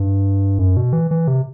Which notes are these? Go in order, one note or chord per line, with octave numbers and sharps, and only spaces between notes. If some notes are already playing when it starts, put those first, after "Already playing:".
Already playing: G2
F#2
B2
E3
E3
C3